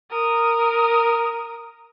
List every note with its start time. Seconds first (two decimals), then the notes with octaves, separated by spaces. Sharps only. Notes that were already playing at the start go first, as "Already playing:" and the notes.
0.10 A#4 D#6